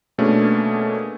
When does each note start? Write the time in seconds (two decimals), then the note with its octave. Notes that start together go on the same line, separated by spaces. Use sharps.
0.18 B2 A3 A#3 C#4 D4 G#4